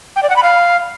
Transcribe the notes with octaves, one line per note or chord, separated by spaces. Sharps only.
G5
D5
F#5
B5
F5